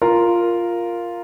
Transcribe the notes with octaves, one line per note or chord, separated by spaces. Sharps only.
F4 A#4